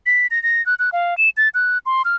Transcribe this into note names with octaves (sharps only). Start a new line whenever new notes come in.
B6
A#6
A#6
F#6
F#6
F5
E7
A6
F#6
C6
F6